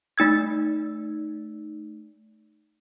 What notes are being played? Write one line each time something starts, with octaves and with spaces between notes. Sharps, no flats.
A3 D#4 E6 G#6